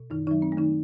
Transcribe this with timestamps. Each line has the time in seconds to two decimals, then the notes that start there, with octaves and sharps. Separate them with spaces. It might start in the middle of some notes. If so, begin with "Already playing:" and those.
Already playing: B2
0.10 F#2 D#3 D#4
0.27 D#3 F#3 D#4
0.42 C4
0.52 A3
0.57 D#3 D#4